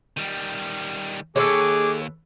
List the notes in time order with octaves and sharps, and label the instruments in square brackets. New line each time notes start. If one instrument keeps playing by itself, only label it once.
[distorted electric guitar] D#3 G3
[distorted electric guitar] D#2 [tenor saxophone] G#4 [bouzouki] A4 B4 C#5 [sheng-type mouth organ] D6